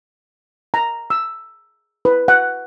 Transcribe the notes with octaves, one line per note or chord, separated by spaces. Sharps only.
A#5
E6
B4
F#5